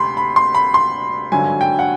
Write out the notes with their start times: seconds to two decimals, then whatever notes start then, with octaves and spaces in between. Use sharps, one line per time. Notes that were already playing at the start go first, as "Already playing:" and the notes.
Already playing: D2 C3 B5 C6
0.17 B5
0.36 C6
0.55 B5
0.74 C6
1.32 G#1 G2 D3 F#3 G#5
1.61 G5
1.79 F#5